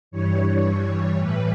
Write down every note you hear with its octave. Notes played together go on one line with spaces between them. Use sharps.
G2 E3 G3 C#5
A2 E3 G3 B4